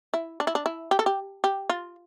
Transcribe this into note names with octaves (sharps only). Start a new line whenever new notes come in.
E4
D4
E4
D4
E4
G4
A4
G4
G4
F4